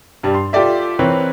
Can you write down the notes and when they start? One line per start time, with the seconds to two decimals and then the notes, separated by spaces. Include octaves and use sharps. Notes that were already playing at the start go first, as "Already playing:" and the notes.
0.23 G2 G3
0.34 C6
0.53 F4 G4 A4 D5 E5
0.99 E3 C4 A#4 B4 C#5